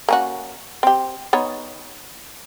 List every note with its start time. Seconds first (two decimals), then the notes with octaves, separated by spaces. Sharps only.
0.08 A#3 C#4 F#4
0.83 C4 G4
1.33 B3 D#4 C#5